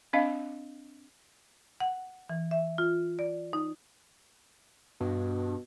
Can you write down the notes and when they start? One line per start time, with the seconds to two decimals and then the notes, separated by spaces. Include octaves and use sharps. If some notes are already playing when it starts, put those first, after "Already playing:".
0.13 C4 D4 D#5 F5
1.80 F#5
2.29 E3
2.51 E5
2.78 F4
3.19 D5
3.53 D#4
5.01 G2 B2